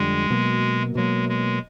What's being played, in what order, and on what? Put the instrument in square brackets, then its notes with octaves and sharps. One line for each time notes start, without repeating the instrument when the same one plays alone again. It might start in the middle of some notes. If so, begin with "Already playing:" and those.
Already playing: [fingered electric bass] F2 D3 G3 [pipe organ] G#3
[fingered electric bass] B2 F#3 A#3
[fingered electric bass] B2 F#3 A#3 [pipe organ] G#3
[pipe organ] G#3